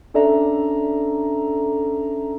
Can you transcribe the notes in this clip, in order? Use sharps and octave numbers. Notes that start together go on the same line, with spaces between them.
C#4 D4 A4 D5 E5 A#5